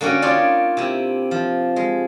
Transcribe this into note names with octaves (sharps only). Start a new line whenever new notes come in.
D3 A#3 C#4 F#4 G5
D4 D#4 F4 C#5 D5
C3 E4
F3
G#3